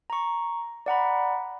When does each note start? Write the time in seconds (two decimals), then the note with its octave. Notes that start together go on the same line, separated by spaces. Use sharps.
0.10 A#5 C#6
0.86 D5 F#5 A#5 B5